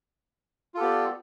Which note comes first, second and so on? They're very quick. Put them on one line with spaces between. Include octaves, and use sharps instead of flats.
F4 A4 G4 B3 D5